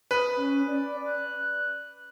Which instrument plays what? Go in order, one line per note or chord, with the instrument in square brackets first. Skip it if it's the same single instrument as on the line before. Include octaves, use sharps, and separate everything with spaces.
[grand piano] B4 [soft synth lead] D#6
[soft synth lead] C#4
D5
F#6